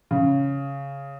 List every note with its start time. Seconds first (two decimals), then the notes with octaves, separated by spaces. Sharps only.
0.11 C#3